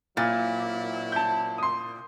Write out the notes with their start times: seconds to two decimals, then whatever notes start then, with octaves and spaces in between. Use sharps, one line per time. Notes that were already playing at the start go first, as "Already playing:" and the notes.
0.17 A#2 F#3 C4 E4 A6
1.12 A5 G6
1.58 C6 D#6